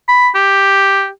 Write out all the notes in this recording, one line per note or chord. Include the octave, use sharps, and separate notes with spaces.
B5
G4